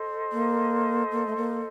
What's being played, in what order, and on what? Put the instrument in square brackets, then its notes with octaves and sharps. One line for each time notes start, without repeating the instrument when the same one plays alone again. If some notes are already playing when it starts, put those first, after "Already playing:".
Already playing: [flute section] A4 C5 D#5
[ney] A#3
A#3
A3
A#3